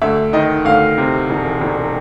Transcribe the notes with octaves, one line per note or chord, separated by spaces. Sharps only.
D2 E5
D#3 D#5
D2 F5
C3
E1
E1